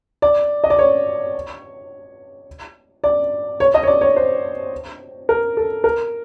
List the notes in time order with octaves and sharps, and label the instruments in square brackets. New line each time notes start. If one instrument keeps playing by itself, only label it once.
[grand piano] D5
D#5
D5
C#5
D5
C#5
D#5
C#5
D5
C#5
C5
A#4
A4
A#4